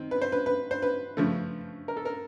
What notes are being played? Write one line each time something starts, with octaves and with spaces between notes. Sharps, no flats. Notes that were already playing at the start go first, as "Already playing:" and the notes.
Already playing: D#3 C4
B4
C5
B4
B4
C5
B4
C#3 F3 A3
A#4
A4
A#4